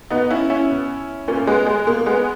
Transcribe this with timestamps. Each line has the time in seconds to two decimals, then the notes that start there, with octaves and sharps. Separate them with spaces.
0.10 B2 B3 D#4
0.30 C#4 E4
0.50 C#4 E4
0.70 B2
1.28 A#2 A#3 C#4
1.47 G#3 B3
1.67 G#3
1.87 B2 A#3
2.06 G#3 B3